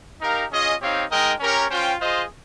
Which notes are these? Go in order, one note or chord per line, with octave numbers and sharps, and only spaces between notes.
D#4 G4 A#4 F5
C#4 F4 G#4 D#5
C4 D#4 G4 C#5 F5
G#3 D#4 A#4 D#5 G5
C#4 G4 A#4 C#5
C#4 F4 C5 G5
F4 G#4 C5 D#5